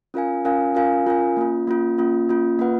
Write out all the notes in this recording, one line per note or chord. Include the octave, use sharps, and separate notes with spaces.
C#4 F4 A#4 F5 G#5
C#4 F4 A#4 F5 G#5
C#4 F4 A#4 F5 G#5
C#4 F4 A#4 F5 G#5
A#3 C#4 F4
A#3 C#4 F4
A#3 C#4 F4
A#3 C#4 F4
A#3 F4 B4 F#5